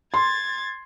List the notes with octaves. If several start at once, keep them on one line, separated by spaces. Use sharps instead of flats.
C6 G#6 A6